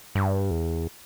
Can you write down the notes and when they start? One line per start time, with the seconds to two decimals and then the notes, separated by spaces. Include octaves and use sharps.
0.15 G2
0.51 E2